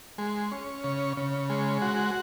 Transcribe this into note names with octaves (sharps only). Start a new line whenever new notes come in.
G#3
C#4
C#3
C#3
G#3
F#4